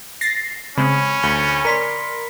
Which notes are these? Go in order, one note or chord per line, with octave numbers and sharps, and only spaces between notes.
A6 A#6 C7
C#3 G#3 C4 C#4 B5
D2 B5 C#7 G7
A#4 D5 A#5 C6 B6